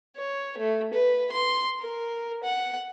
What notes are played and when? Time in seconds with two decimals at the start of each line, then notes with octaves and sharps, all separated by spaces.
0.17 C#5
0.58 A3
0.94 B4
1.32 C6
1.80 A#4
2.44 F#5